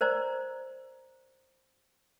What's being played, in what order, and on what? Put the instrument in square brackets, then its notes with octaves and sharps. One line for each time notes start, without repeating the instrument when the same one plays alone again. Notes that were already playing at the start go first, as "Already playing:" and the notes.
[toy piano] A#4 C5 D5 A#5